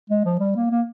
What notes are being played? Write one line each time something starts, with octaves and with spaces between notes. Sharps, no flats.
G#3
F3
G3
A#3
A#3